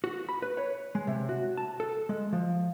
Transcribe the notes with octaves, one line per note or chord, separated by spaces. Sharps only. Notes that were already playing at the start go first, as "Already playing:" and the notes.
F#4
B5
B4
C#5
G#3
C3
F#4
A5
A4
G#3
F3